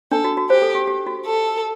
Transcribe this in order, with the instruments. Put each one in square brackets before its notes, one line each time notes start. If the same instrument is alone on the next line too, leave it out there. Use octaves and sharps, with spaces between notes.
[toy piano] D4 [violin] A4
[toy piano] F#4
F#4
[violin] G4 [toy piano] C5
[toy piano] A4
G4
G4
F#4
[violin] A4